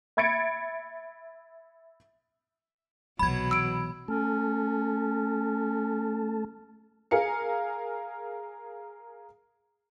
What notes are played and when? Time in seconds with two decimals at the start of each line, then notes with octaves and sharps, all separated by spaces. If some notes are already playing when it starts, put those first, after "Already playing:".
0.17 E5 B5 G#6 A6 C#7 D7
3.19 C2 B2 E3 F#3 B5 G#6
3.51 E6 D7
4.08 A3 C#4 A4
7.11 G#4 A#4 F5 C#7